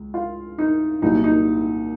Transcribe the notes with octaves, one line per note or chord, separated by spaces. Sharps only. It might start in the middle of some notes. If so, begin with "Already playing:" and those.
Already playing: C#2
F4
D#4
C2 A#2 F#3 D#4
D#4